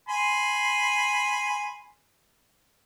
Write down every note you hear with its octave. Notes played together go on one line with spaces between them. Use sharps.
G#5 B5 C6